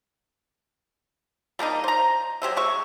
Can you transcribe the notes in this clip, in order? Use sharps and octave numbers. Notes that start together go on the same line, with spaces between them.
G3 A#3 D4 D#4
C5 A#5
F#3 G4 C5 E5
G#3 E5 C#6